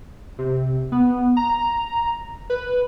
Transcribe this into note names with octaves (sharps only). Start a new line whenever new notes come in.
C3
B3
A#5
B4